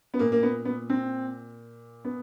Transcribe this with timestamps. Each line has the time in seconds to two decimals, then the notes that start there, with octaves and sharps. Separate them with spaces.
0.14 B3
0.19 A#2 A#3
0.32 A#3
0.43 B3
0.65 B3
0.90 C4
2.05 B3